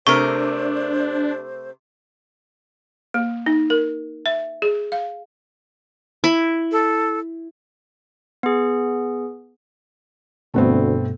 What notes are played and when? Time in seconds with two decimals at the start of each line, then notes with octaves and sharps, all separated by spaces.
0.07 C3 A3 D4 A#4 C5 C#6
3.14 A#3
3.46 D#4
3.70 A#4
4.26 E5
4.62 G#4
4.92 F5
6.24 E4
6.72 A4
8.43 B3 G#4
10.54 D2 G2 B2 A3 B3 C4